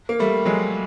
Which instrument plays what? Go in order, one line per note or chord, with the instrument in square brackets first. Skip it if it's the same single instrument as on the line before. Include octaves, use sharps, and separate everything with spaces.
[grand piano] A#3
G3 A3
F#3 G#3